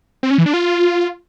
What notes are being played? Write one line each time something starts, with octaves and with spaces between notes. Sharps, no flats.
C4
C#4
E3
D4
F4